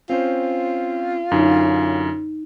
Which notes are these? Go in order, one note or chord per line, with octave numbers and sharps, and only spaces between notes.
C4 C#4 F4 C5
F#2 D3 C#4 D#4